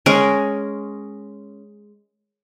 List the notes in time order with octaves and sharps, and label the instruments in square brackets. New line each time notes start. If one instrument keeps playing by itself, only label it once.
[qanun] G#3 C#4 A#4 G#5